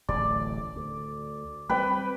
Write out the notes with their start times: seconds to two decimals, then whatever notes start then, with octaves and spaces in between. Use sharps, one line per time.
0.09 D1 A1 A2 D5
0.76 D2
1.69 G3 A3 C4 B4 G5 B5